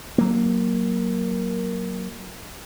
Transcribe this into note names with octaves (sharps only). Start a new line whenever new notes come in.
F#3 A#3